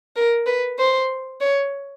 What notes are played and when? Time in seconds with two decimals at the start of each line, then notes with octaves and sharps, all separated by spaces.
0.16 A#4
0.46 B4
0.78 C5
1.41 C#5